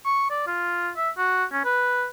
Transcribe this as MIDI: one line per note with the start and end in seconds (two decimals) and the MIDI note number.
0.05 0.27 85
0.30 0.44 74
0.47 0.90 65
0.97 1.10 76
1.18 1.45 66
1.52 1.63 61
1.65 2.07 71